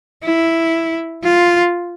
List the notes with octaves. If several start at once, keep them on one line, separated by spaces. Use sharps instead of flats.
E4
F4